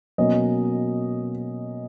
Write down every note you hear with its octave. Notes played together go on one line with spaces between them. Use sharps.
B2 F#3 A#3 C#4 D#5